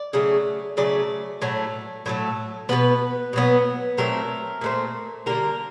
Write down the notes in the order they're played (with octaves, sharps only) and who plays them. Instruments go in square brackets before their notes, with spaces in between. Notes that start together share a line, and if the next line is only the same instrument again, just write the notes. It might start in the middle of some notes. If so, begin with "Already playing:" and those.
Already playing: [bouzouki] D5
C#3 F#3 A3
C#3 F#3 A3 D5
A2 F#3 A3
A2 F#3 A3
B2 F#3 B3 B4
B2 F#3 B3
A#2 F#3 A3 C4 A#4
A#2 F#3 A3 C4
D3 G3 A#3 A#4